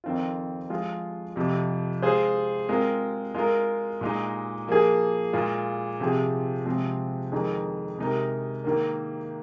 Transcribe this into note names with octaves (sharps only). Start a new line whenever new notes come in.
F2 D#3 C4 F4
F3 G#3 F4
F2 C3 F3
G#3 F4 G#4 C5
G#3 C4 F4 A#4
G#3 F4 A#4
A#2 G#3 D#4
F3 A#3 G#4
A#2 G#3 F4
C3 F3 C4 G#4
C3 F3 G#3 C4
F2 D#3 G#3 D#4 G#4
C3 G#3 D#4 A#4
G#2 D#3 A#3